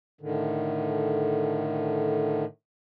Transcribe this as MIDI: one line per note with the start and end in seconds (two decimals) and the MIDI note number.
0.21 2.45 45
0.21 2.45 50
0.21 2.45 51